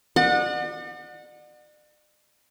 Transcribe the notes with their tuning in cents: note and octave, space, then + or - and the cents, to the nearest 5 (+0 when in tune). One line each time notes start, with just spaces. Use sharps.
D5 +45 F#5 -20